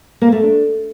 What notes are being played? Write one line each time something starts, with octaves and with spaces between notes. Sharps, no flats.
A#3
A3
D4